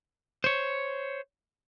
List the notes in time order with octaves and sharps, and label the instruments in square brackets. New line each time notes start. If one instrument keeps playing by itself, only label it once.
[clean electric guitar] C5 C#5